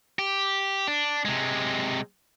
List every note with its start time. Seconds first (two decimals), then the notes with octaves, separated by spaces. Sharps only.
0.19 G4
0.87 D4
1.25 C3 G#3